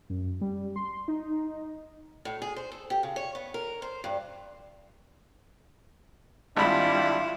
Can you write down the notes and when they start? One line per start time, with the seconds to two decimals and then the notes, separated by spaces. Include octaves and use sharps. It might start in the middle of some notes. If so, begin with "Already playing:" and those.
0.10 F#2
0.41 G3
0.76 C6
1.08 D#4
2.25 A2
2.42 G#4
2.56 C5
2.72 A4
2.90 G4
3.03 C#3
3.16 C#5
3.35 B3
3.54 A#4
3.82 C5
4.04 G2
6.57 G#1 G3 D4 E4 F4 B5